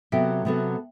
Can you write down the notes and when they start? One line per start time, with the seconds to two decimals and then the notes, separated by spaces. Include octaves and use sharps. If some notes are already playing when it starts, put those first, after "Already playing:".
0.12 C3 F#3 B3 F#4 A4 E5 G5
0.45 C3 F#3 B3 F#4 A4